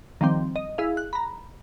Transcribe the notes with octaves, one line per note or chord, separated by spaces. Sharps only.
D#3 F3 G3 C4
D#5
E4 G#4 F5
F#6
A#5 B5